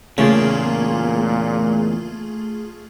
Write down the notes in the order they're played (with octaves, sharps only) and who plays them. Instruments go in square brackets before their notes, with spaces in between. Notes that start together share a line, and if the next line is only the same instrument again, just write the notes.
[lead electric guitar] E2 A#3 [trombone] A#2 [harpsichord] C#3 [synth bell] A3 F4 G#4